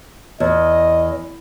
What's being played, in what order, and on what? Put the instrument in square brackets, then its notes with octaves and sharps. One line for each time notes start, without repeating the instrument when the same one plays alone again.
[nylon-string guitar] E2 [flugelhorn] D#5